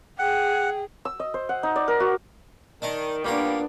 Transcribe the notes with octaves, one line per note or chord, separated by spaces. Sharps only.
G#4 F#5 G5
E6
D#5
C5
F#5
D#4
D5
A#4
F#4
D#3 D4 D#5 A#5
A#2 G3 A#3 B3 D4 C#5 A#5